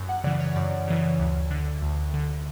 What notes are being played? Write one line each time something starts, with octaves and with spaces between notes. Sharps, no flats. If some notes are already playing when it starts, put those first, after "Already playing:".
Already playing: F#2
F#5
C#3 E3 D5
C#5
F#2 D5
C#3 E3
D2
D3
D2
D3